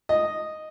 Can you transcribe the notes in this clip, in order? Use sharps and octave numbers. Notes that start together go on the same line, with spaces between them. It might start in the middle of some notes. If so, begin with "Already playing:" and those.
D#5